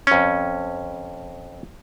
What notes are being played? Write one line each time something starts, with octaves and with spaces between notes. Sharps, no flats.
F2 C#4